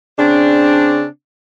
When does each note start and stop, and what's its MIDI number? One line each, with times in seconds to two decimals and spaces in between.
0.19 1.05 49
0.19 1.05 60
0.19 1.05 62